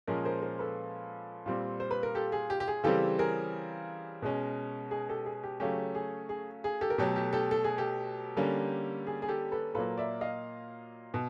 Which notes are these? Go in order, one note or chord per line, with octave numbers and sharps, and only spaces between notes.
A#2 F3 G#3 C#4 G#4 A#4
A#4 C5
A#4 C5
A4 B4
A#2 G3 C4
C5
B4
A#4
G4 A4
G#4
G4
G4
G#4
C#3 E3 G3 C4 G4 A4
G#4 A#4
B2 G#3 C#4
G#4
G4 A4
G#4
G4
C#3 F#3 A3 C#4 G4
G#4
G#4
G#4
G4 A4
A#4
B2 F#3 A3 G4 A4
G4
G4 A4
A4
G#4
G4 A4
D3 G3 A#3 C#4
G#4
G#4
G4 A4
A4 B4
A#2 F#3 A#3 A4 B4
D5 E5
D#5 F5
B2